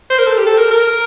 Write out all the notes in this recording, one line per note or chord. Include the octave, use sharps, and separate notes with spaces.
C5
A#4
A4
G4
A4
A#4
A#4